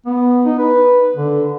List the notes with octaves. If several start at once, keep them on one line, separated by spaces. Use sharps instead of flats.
B3
D#4
B4
D3